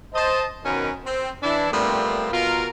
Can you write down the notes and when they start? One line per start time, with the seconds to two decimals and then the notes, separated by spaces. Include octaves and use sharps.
0.14 C5 D#5 A5
0.65 F#2 B2 D#3 C#4 A#4 B4
1.04 C4
1.42 E3 D4 E4
1.71 A#2 G3 A3 B3 C4
2.31 B2 F4 A#4